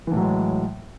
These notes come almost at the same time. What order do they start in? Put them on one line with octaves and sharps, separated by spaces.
E3 A2 F#3 G#3